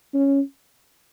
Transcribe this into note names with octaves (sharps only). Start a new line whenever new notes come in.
C#4